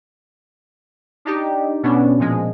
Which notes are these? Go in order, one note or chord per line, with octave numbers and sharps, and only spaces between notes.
D4 D#4 G4
B2 B3 C#4 D4
A#2 F3 G#3